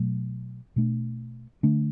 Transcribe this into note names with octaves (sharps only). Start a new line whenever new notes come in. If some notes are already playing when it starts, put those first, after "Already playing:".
Already playing: B2 F#3 A3
B2 A3 D4
D3 A3 D4